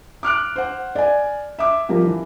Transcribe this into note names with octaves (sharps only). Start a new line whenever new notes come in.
D6 F6 F#6 D7
C5 F#5
D5 G#5
E5 D6
F3 G3 G4 A#4
E3